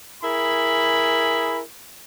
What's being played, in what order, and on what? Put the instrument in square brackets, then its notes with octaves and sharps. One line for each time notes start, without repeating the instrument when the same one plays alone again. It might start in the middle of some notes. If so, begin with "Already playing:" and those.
[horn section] E4 G#4 A#4 G#5 B5